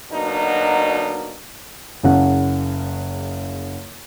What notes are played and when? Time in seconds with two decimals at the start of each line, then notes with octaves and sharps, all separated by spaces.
0.11 B2 D3 F#3 A#3 D4 D#4
2.03 F#1 C#3 F#5